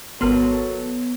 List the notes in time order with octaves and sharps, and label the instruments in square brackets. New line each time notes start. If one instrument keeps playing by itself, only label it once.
[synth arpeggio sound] G#1 A#4 C6 [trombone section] F#3 A4 [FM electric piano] B3